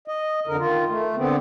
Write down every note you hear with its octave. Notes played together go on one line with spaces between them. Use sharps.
D#5
F2 D3 A#4
D#3 F4
A3
D3 B3 C4